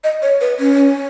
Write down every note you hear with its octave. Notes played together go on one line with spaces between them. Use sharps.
D#5
C#5
B4
C#4